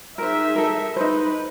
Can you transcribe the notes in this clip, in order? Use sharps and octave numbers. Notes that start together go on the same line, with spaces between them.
D#4 G#4 A#4 C5 E5
A4 A#4
D#4 B4 C5